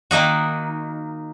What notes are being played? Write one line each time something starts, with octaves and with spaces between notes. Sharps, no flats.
D#3 A#3 D#4 F#4